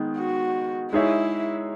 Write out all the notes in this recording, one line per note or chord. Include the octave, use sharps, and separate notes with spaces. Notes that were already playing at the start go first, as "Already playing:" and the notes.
Already playing: D#3 G#3 B3
F#4
G#3 D#4 E4 G#4 C#5 E5